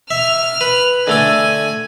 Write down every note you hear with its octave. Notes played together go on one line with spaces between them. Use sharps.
E5 F6 F7
B4
D3 A3 A4 G#5